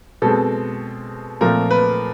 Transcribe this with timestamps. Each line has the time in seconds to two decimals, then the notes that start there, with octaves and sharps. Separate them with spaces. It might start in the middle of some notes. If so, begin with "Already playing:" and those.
0.22 B2 G#3 C4 A4
1.41 A#2 F3 A3 C4 A#4
1.71 B4